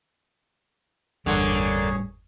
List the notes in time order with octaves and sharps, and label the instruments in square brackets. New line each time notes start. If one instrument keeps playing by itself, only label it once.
[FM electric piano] G1 E2 [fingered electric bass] A2 G3 [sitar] D3 A#3 [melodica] G#4 C#5